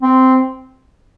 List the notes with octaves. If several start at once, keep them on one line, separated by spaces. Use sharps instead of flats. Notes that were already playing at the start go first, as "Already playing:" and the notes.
C4